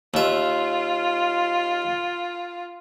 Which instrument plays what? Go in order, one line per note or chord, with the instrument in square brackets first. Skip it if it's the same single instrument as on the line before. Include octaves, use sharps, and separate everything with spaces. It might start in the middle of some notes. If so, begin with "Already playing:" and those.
[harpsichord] D#2 E5 [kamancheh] F4